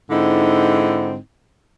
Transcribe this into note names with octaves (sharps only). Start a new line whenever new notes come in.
G#2 D3 C4 D#4 E4